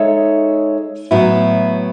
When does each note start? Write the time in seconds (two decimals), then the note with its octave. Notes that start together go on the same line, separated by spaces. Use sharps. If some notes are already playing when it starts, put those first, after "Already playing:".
Already playing: G#3 D#4 A4 C#5 E5
1.11 A2 F#3 B3 E4